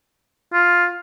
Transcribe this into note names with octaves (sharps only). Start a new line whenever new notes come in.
F4